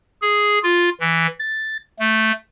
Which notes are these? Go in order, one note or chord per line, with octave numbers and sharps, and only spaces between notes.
G#4
F4
E3
A6
A3